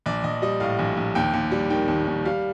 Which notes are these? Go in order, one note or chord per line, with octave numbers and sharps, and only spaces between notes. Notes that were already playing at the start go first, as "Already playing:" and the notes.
A#1 D5
A#1 D#5
G3 D#5
A2 F5
A#1
A#1
D#2 G5
D#2
G3
D#3 G5
D#2
D#2
G3 F5